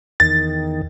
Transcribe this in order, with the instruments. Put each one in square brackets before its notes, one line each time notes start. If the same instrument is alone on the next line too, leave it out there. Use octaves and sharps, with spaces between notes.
[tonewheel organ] E2 D#3 [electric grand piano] A6